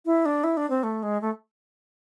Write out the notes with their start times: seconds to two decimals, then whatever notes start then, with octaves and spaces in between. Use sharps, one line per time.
0.06 E4
0.26 D4
0.44 E4
0.57 D4
0.70 C4
0.83 A3
1.03 G#3
1.22 A3